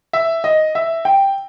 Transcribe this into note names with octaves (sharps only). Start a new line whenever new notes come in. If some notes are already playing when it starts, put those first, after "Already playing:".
E5
D#5
E5
G5